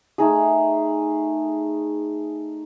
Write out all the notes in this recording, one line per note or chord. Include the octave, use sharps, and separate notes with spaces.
A3 D#4 G#4